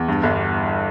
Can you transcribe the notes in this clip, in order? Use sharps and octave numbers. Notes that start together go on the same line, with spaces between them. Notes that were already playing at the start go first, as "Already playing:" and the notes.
Already playing: E2
G2
G1